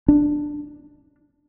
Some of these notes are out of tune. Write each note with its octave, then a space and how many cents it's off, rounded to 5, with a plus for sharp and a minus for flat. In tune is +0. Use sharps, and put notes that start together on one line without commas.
D4 +5